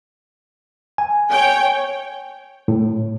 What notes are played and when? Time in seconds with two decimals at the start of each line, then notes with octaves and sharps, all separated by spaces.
0.98 G#5
1.31 C#5 G5
2.68 A2